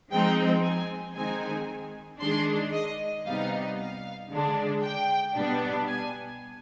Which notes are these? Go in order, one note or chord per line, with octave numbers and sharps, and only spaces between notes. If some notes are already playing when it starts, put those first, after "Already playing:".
F3 G#3 C4 D#4 G5
G#5
D#3 G#3 C4 D#4 G#5
D#3 G#3 D4 C6
D#5
C3 G3 B3 D#4 F5
F5
D3 G#3 D4
G5
B2 G3 B3 D4
G#5